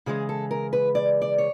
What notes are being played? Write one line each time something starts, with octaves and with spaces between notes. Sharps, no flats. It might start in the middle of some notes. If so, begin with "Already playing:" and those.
C#3 E3 G#3 G#4
A4
A#4
B4
D5
D5
C#5